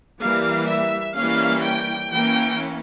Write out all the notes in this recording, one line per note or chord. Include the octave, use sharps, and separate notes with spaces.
E3 G3 A#3 F5
E5
E3 G3 A#3 C#4 F5
G5
E3 A#3 C#4 G5